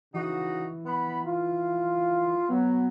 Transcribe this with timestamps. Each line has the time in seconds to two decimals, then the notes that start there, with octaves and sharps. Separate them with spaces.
0.14 C#3 E3 D#4 F#4
0.86 B3 B5
1.25 F4
2.49 F#3 B3